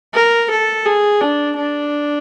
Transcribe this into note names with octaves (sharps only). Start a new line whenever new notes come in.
A#4
A4
G#4
D4
D4